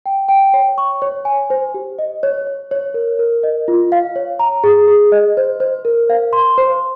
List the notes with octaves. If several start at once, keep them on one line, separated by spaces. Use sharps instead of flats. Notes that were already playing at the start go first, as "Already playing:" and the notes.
G5
G5
C#5
C#6
C#5
G#5
C5
G4
D#5
C#5
C#5
C#5
A#4
A#4
D#5
F4
F5
C#5
A#5
G#4
G#4
D#5
C5
C5
A#4
F5
C6
C5